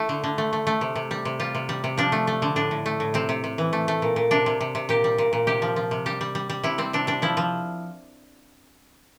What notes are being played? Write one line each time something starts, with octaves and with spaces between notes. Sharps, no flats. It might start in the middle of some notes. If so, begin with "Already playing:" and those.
Already playing: A3 E4
D3
D3
A3
A3
A3
C3
C3
G3
C3
G3 F4
C3
G3
C3
F3 D4
A3
A3
D3
A2 D4
A2
A3
A2
C3 C4
C3
C3
E3
A3
A3
A#2
A#2
C3 D4
C3
C3
C3
A#2 G4
G3
A#2
A#2
C3 G4
F3
F3
C3
G3 G4
G3
G3
G3
C3 E4
G3 C4
C3 D4
G3 D4
F3 E4
F3